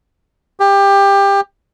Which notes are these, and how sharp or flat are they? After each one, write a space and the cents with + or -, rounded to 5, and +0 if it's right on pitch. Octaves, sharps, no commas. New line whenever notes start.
G4 +20